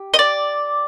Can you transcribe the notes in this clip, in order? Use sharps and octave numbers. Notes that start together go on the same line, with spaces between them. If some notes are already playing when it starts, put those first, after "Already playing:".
Already playing: G4
D#5
D5